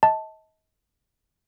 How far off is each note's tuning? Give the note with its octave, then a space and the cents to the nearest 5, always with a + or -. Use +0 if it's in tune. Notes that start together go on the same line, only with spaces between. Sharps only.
D#5 +35 A5 +0